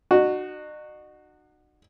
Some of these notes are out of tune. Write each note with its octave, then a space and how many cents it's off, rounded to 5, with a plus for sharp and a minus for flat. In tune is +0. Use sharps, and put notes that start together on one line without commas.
D#4 -45 F#4 +0